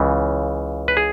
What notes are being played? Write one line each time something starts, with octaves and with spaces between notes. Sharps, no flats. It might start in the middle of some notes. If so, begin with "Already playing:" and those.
Already playing: C#2 C#3 E3
B4
G#4